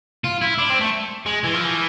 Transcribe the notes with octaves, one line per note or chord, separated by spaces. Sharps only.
F4
E4
D4
C4
A3
G#3
E3
F3
E3